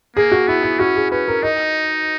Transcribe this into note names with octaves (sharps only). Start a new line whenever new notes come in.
A#3 G#4
F#4
B3 E4
E4
C#4 F#4
G#4
C#4 B4
A#4
D#4 D#5